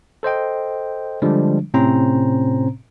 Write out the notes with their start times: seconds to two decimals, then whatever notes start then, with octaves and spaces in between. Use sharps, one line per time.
0.23 A4 C5 D#5 G5
1.22 D3 F3 G3 G#3 D4
1.74 A2 C3 C4 C#4 C5 A#5